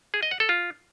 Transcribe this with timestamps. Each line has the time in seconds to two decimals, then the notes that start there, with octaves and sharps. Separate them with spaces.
0.14 G#4
0.23 D#5
0.31 F#5
0.40 A4
0.49 F4